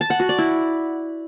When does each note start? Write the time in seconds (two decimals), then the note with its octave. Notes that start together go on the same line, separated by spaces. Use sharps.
0.01 A5
0.10 F#5
0.20 F#4
0.29 D5
0.38 E4